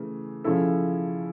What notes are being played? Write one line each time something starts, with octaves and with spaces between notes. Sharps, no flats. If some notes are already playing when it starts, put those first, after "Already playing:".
Already playing: C#3 E3 A3
C#3 F3 C#4 E4 A4